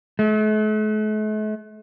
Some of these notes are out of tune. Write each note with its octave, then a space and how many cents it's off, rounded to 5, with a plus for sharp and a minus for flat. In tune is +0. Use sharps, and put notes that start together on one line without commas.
A3 -45